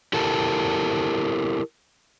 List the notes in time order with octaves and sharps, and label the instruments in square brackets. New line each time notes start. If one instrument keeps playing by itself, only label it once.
[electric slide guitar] E4 G4 A4 A#4 A5